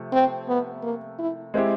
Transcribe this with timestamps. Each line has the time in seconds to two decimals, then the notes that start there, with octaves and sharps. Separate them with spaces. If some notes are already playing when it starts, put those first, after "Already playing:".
Already playing: C3 F3 A3
0.12 C4
0.48 B3
0.83 A#3
1.19 E4
1.54 G#3 C4 E4 G4